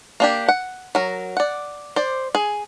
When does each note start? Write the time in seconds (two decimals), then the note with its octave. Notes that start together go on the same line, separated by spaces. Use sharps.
0.20 A#3 D4 G4
0.48 F#5
0.95 F#3 A#4
1.37 D5 F#5
1.96 C5 D5
2.35 G#4